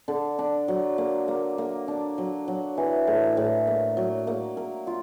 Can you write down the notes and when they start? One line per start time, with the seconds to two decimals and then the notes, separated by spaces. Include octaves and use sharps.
0.08 D3
0.39 D4
0.68 F#3
0.98 A#3
1.28 A#3
1.58 A#3
1.88 D4
2.18 F#3
2.48 F#3
2.77 E3
3.07 A2
3.37 A2
3.67 A#3
3.97 F#3
4.27 A#3
4.57 A#4
4.87 F4